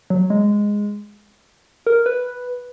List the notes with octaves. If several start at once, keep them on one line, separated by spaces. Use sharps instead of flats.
F#3
G#3
A#4
B4